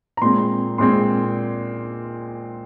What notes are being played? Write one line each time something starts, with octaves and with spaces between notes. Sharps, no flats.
A#5
A#2 G#3 C4 C6
A#2 G#3 C4 C6